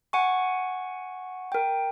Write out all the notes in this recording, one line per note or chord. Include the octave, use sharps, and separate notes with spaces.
F#5 G#5 C#6
A#4 G5